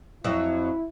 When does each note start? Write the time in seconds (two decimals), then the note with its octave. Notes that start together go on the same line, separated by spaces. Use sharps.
0.24 F2 F#3 E4